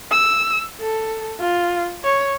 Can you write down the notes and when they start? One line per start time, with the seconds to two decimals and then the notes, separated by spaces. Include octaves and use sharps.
0.12 E6
0.81 A4
1.40 F4
2.04 C#5